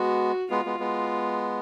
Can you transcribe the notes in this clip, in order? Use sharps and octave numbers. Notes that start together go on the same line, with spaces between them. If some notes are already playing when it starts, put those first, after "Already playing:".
Already playing: G#3 B3 F#4
G#3 B3 F4
G#3 B3
G#3 B3